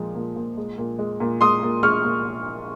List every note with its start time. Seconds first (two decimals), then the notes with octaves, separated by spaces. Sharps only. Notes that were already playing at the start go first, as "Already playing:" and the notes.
Already playing: A#2 F3 G#3
0.15 A#2
0.36 A#2
0.57 G#3
0.78 A#2
0.99 G#3
1.20 A#2
1.41 G#3 C6 D#6
1.63 A#2
1.83 G#3 C#6 F6
2.04 A#2